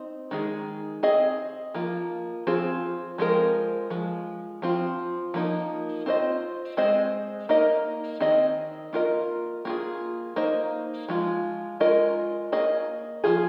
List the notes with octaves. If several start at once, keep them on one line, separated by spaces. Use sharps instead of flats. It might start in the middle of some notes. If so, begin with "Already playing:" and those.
Already playing: C4 D#4
D#3 G#3 D#4 G#4
C4 G#4 D#5
F3 A#3 F4
F3 C4 F4 G#4
F3 G#3 C4 F4 A#4
F3 G#3
F3 C4 F4
F3 A#3 D#4
C4 F4 C5 D#5
G#3 C4 G#4 C5 D#5
A#3 D#4 A#4 D#5
D#3 C4 G#4 D#5
A#3 F4 A#4 D#5
A#3 F4 G#4
A#3 D#4 C5 D#5
F3 G#3 F4
G#3 F4 A#4 D#5
A#3 G#4 D#5
F3 A#3 F4 G#4